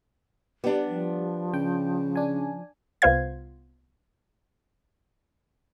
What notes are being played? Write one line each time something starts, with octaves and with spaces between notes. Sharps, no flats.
G3 B3 D4 G4
F3
C#3 G5
D4 G#5
C2 B3 F4 C5 F5 G#6